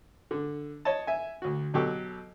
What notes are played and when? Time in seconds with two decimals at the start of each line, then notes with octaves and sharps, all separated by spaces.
0.31 D3
0.85 C#5 D#5 A5
1.07 E5 G#5
1.42 D2 F#4
1.74 B2 F#3 F#4 G4 A4 C#6